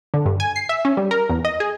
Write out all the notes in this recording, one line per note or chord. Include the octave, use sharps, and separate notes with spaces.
D3
G2
G#5
C7
E5
C#4
G3
A#4
E2
D#5
G#4